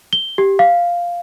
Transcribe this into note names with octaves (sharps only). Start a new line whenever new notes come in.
G7
G4
F5